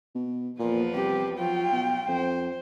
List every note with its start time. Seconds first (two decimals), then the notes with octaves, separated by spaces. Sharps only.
0.15 B2
0.59 E2 A#2 F3 B4
0.95 C2 G4
1.39 F3 F#3 F4 G5
1.72 B2
2.08 F2 C5